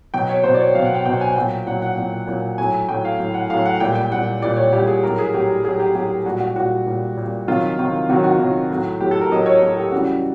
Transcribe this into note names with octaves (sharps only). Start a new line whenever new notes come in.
B2 F#3 G5
C#5
B2 F#3 C5
D5
C#5
B2 F#3 F5
F#5
G5
B2 F#3 G5
G#5
A#2 F#3 G5
A#2 F#3 F#5
F#5
A#2 F#3
A#2 F#3
A2 F#3 G#5
A2 F#3 G5
F5
A2 F#3
F#5
A2 F#3 F5
F#5
A#2 G3 G5
G5
A#2 G3 F#5
A#2 G3 D5
C#5
A#2 G3 G4
G#4
A2 F#3 A#4
G#4
A2 F#3 G4
A2 F#3 G#4
G4
A2 F#3 G4
A#2 G3 F#4
F#4
A#2 G3 F#4
A#2 G3
A#2 G3
C3 D#3 F#3 F4
C3 D#3 F#3
C3 D#3 F#3 F#4
F#4
C3 D#3 F#3
A2 F#3
A2 F#3 G4
A4
A#4
A2 F#3 D#5
C#5
A2 F#3 A#4
G4
C#3 E3 G3 F#4